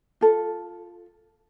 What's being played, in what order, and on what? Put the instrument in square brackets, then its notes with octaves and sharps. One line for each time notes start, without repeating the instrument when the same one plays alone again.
[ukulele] F4 A4